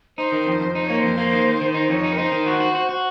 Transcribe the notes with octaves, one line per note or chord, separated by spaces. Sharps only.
D#4 C5
D#3
F2
F2
D#4 C5
A#3 C#5
F2 C5
A#3
D#3
D#3
D#3
D#4
F2 C#5
D#4
A#4
D#4 C5
D#3
F#4
F#4
F#4
F#4